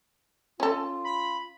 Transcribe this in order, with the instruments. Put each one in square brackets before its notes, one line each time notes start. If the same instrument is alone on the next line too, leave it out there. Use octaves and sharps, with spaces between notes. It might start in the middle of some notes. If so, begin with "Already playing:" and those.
[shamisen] C#4 A4 [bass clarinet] F4
[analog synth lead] B5